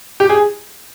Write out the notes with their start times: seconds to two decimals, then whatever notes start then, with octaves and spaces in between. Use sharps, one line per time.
0.20 G4
0.29 G#4